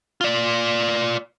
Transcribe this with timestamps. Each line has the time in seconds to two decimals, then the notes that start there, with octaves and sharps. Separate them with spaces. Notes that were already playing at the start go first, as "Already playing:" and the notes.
0.21 F4 D5